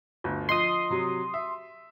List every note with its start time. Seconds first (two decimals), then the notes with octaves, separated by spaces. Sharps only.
0.24 G1 D2
0.49 F3 D#5 C6 D#6
0.90 C3 F#3
1.34 E5